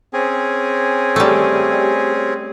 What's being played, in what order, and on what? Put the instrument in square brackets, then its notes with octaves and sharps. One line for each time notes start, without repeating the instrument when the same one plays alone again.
[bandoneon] C4 C#4 G#4
[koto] G3 A3